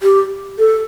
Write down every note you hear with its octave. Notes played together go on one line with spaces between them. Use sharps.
G4
A4